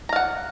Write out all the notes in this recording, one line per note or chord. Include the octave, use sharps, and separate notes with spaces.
F5 F#5 A#5